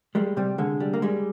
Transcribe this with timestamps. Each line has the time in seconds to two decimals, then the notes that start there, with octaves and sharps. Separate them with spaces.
0.15 G3 G#3
0.37 C3 G3
0.58 D3 G#3
0.80 G3
0.93 A#3
1.02 G3 G#3